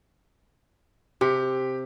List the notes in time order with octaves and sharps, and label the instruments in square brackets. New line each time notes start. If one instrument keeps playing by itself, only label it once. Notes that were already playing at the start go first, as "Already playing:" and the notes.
[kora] C3 [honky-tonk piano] G4